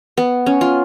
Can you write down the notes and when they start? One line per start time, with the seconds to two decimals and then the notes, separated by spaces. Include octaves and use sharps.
0.18 B3
0.46 C#4
0.61 F4